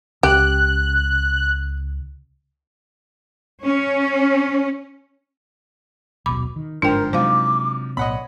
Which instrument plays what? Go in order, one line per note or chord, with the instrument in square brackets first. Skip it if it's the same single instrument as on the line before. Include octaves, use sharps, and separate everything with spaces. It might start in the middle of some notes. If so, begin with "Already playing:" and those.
[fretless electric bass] C#2 [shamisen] G4 [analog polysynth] F#6
[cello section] C#4
[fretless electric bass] D#1 B1 B2 [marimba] B5 D6
[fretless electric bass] D#3
[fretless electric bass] G1 G#2 [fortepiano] F3 C5 [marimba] D4 G5 [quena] A#4
[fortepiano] G#2 F3 [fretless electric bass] C3 F#3 [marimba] C5 F5 [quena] D6
[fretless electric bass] B1 A2 B3 [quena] C#5 [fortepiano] D#5 F#5 B5